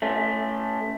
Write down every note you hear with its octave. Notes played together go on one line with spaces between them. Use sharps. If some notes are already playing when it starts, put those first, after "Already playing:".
A3 C#4